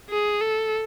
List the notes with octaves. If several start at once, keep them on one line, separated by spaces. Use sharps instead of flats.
G#4
A4